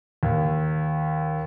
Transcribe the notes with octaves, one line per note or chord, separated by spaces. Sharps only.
D#2